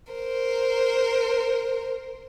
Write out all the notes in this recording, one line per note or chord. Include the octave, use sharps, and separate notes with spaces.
A#4 C5